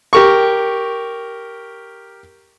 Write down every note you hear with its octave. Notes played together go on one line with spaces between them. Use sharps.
G4 A#4 C#6